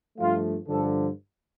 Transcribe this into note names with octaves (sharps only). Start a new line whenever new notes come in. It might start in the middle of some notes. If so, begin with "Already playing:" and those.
G2 F3 A3 F4
G2 D3 F3 A4